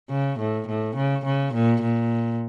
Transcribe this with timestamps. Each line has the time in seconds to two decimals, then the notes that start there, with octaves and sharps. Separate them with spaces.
0.10 C#3
0.39 A2
0.67 A2
0.96 C#3
1.25 C#3
1.54 A#2
1.82 A#2